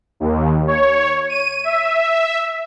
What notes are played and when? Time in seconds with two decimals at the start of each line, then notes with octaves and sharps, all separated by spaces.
0.20 D#2
0.67 C#5
1.29 D#7
1.64 E5